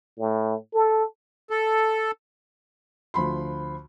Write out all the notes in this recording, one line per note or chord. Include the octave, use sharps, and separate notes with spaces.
A2
A4
A4
D2 F3 B5 C6